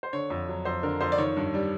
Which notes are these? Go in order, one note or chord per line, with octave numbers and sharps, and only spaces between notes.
C5
D3 C#5
F2
F#3
F2 C5
D3 A#4
F2 C5
D5
D#3 C#5
G2
G3